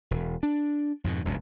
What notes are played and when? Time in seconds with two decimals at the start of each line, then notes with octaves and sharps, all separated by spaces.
0.11 E1
0.43 D4
1.04 F2 G#2 B2
1.25 F1 C#2 G2 B2